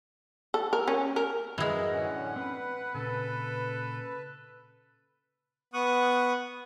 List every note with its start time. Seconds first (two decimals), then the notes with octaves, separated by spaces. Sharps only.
0.54 A4
0.73 A#4
0.88 C#4
1.16 A#4
1.58 F#2 E3 G#3 F#4 A#4 B4
1.91 A2 D3 C#4 F#5
2.36 C4 B4
2.94 A#2 C#3 A4
5.74 B3 C#6 D#6 F#6